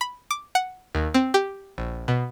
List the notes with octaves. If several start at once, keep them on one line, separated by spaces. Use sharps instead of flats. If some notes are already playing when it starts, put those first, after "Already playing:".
B5
D6
F#5
D#2
C4
G4
A#1
B2